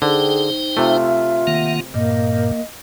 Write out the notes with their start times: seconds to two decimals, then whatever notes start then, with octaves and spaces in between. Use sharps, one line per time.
0.02 D3 D#4 G#4 C5 G5
0.77 C3 A3 F4 E5
1.47 D#3 A#3 F#5
1.94 G2 A#2 A#3 D#5